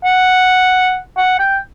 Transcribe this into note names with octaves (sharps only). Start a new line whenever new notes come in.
F#5
F#5
G5